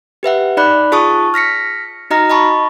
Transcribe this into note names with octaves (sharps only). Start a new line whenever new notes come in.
G4 B4 E5 F#5
D#4 D5 B5 F#6
F4 G#4 A5 C#6 D#6
F6 A#6 B6 C#7
D#4 F#4 D#5 A#5 F6 A#6
D#5 A5 B5 C#6